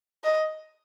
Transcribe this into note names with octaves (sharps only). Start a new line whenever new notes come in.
D#5